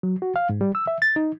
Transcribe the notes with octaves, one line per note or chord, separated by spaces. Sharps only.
F#3
F#4
F5
G#2
G3
E6
E5
A6
D#4